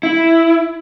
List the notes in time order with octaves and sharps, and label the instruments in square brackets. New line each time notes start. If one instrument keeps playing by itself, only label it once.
[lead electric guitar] E4